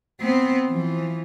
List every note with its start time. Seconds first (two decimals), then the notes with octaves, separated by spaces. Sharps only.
0.20 B3 C4
0.66 E3 F3